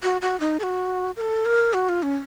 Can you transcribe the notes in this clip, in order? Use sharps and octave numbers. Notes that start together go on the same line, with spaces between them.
F#4
F#4
D#4
A4
F#4
A#4
A4
A#4
F#4
F4
C#4